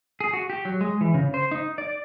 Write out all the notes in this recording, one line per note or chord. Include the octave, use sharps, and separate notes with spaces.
G#4
F#4
G4
F#3
G#3
E3
C#3
C5
D#4
D5